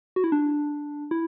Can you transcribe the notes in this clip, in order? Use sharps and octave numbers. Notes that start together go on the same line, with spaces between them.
F#4
E4
D4
E4